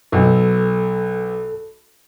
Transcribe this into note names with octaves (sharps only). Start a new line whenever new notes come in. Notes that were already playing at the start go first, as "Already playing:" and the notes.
B1 A4